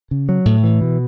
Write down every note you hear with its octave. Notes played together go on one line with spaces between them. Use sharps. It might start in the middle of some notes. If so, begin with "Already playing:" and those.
C#3
F#3
A2
E3
B2